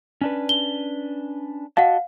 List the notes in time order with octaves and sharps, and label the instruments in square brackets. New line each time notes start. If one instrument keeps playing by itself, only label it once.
[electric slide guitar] C#4 D4 B4
[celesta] G7
[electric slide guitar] F#4 D#5 A5 [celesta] F5 F#5